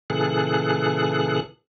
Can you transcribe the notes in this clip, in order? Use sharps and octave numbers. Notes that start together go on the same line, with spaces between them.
A#2 C#3 E3 G#4 A4 F#6